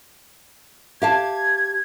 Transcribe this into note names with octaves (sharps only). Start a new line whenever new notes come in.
G4 F5 A5 G#6